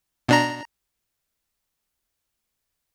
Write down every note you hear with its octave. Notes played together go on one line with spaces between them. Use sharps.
B2 D4 A#5